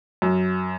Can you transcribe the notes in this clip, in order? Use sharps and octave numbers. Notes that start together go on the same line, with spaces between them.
F#2